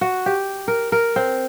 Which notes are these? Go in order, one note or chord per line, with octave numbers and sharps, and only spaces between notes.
F#4
G4
A#4
A#4
C4